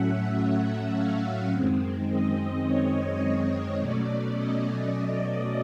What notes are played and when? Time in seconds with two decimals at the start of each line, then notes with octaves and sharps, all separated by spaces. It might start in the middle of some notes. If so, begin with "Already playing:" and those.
Already playing: A2 F#3 A3 C#4 E5 F#5
0.38 F#5
0.95 F5
1.52 F#2 D#3 G#3 C4
2.08 D#5
2.66 C#5
3.79 B2 F#3 A3 C#4 D5
4.36 D#5